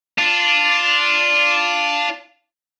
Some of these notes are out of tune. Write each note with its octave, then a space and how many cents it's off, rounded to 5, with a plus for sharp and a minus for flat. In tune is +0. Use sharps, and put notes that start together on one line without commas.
D4 +0 F4 +0